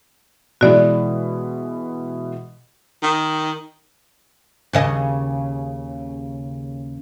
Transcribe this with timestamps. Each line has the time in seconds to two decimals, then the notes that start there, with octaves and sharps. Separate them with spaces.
0.61 B2 E3 G#3 F#4 D5
3.02 D#3
4.73 D#2 C#3 D#5